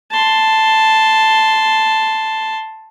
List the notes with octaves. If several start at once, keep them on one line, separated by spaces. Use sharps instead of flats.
A5 C6